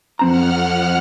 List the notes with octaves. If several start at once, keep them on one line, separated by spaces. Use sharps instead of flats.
F2 F3 C4 F#5 A#5 F6